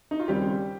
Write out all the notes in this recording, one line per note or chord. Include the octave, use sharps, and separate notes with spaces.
D#4
F4
D#2 C#3 G3 C4 G4